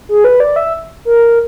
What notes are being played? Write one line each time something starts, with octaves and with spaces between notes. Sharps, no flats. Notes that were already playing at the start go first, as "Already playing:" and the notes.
G#4
B4
D5
E5
A#4